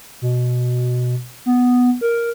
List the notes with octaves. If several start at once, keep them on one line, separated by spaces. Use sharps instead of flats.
B2
B3
A#4